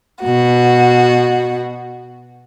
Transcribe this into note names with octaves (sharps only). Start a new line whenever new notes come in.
B2 F#4